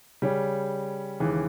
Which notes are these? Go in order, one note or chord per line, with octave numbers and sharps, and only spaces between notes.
C#3 G3 C#4
D#2 C#3 E3 G#3